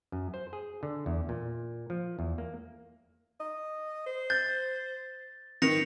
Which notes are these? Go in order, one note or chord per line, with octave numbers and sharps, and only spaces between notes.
F#2
C5
G#4
D3
E2
A#2
F3
E2
A#3
D#5
C5
G6 A6
D#3 B4 A#6 C#7 F7